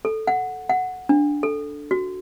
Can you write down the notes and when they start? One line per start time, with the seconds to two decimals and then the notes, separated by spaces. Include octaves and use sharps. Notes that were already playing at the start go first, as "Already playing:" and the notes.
0.05 A4
0.27 F#5
0.70 F#5
1.09 D4
1.43 A4
1.91 F#4